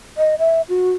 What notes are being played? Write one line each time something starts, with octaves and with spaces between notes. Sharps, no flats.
D#5
E5
F#4